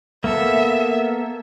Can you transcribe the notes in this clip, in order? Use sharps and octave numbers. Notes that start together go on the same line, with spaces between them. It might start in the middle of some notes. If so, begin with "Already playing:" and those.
A#3 B3 A4 E5